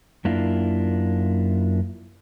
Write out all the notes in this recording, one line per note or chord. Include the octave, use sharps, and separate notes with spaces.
F#2 A#3 D4 E4 F4